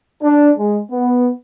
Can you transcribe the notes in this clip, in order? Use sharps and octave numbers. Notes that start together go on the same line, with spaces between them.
D4
G#3
B3